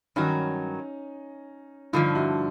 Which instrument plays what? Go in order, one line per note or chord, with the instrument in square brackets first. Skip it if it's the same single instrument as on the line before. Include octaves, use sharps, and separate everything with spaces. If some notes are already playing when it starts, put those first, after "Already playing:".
[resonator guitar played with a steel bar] G2 D#3 F#3 [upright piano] C#4 D#4
[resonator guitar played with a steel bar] G2 D3 F3 [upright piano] D#4 F4
[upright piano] E4 F#4